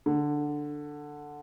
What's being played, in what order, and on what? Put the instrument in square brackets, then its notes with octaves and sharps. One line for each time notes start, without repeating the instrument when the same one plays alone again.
[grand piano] D3